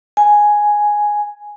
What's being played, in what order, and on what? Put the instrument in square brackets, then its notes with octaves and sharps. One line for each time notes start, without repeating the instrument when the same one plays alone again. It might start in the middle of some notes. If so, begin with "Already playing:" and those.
[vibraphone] G#5